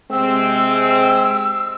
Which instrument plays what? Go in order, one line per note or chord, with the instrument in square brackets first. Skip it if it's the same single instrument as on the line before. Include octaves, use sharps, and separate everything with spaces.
[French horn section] C3 G#3 C4 [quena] E6